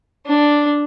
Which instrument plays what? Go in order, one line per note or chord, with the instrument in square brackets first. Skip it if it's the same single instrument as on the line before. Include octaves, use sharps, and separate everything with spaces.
[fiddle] D4